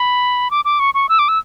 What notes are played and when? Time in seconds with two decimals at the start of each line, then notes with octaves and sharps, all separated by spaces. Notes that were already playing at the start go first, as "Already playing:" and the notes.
Already playing: B5
0.51 D6
0.65 D6
0.80 C#6
0.94 C#6
1.09 E6
1.19 D6
1.29 E6